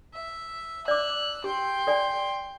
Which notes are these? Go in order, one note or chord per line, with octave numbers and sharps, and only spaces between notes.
E5
D5 D6 E6 F#6
G4 G5 C6
A4 D5 G#5